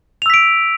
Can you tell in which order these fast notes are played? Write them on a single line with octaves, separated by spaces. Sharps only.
F7 E6 B6 D7